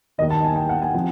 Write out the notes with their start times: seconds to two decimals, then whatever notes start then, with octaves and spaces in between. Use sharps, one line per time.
0.18 D#3 D#5
0.22 D#2
0.30 A5
0.44 G#5
0.56 G5
0.69 F#5
0.82 G#5
0.95 C3 F3 G#5